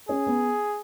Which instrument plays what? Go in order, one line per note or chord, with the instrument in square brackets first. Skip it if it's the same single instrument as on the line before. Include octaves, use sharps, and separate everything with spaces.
[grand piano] C#4 [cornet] G#4
[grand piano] B3